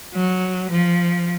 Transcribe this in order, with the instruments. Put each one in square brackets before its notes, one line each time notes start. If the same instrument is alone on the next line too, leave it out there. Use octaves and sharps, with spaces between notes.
[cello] F#3
F3